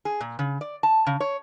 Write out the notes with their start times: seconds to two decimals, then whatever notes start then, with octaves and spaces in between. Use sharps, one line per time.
0.05 G#4
0.21 A#2
0.39 C#3
0.61 D5
0.83 A5
1.07 C#3
1.20 C#5